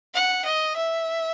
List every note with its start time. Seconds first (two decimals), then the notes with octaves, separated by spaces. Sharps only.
0.14 F#5
0.45 D#5
0.76 E5